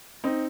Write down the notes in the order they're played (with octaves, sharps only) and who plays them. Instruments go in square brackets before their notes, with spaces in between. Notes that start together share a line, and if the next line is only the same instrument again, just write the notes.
[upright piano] C4 D#4